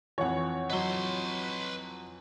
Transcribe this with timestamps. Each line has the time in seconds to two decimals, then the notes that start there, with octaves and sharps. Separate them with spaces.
0.18 F2 E3 C#5 F#5
0.70 F#3 B4 D#5 C6